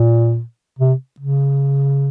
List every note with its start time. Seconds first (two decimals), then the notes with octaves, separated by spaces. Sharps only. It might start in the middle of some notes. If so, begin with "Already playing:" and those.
Already playing: A#2
0.79 C3
1.20 C#3